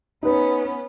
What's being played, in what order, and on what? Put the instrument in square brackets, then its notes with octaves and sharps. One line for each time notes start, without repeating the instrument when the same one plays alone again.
[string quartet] B3 C#4 [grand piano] D#4 B4